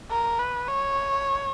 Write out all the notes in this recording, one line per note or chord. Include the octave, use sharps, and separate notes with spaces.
A#4
B4
C#5